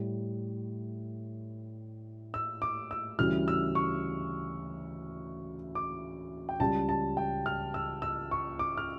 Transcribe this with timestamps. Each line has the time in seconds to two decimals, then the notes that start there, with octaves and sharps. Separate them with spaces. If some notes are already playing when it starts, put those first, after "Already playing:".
Already playing: A2 G3
2.34 E6
2.62 D6
2.91 E6
3.19 D2 C#3 E3 G3 F6
3.48 E6
3.75 C#6
5.75 D6
6.49 G5
6.60 C#2 C#3 G3 A5
6.89 A5
7.17 G5
7.46 F6
7.74 E6
8.02 E6
8.31 C#6
8.59 D6
8.77 F6